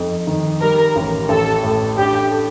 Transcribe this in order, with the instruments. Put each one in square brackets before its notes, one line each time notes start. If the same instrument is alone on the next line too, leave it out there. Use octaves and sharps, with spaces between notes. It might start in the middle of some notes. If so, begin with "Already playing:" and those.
Already playing: [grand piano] F2 D#4
D#3
[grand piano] G3 [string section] A#4
[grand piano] A1
[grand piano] A1 [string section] A4
[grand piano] A2
[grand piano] D4 [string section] G4
[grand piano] A4